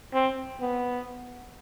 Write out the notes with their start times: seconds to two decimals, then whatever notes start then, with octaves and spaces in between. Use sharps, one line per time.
0.13 C4
0.61 B3